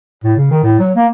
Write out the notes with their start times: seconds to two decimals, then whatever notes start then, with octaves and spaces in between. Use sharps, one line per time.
0.24 A2
0.37 C#3
0.51 D#3
0.63 A2
0.79 F#3
0.96 A#3